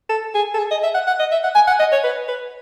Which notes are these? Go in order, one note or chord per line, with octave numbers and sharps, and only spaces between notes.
A4
G#4
A4
G#4
D#5
E5
F#5
F#5
D#5
E5
F#5
G#5
F#5
D#5
C#5
B4
B4